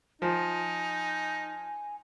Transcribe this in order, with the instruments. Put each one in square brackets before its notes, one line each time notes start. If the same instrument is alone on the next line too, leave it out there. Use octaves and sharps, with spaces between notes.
[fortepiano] F3 [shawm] D#4 [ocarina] G#5